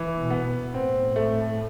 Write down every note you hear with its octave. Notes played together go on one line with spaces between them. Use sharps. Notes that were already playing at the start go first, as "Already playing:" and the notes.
Already playing: E3
B2
B3
A2 C4
A3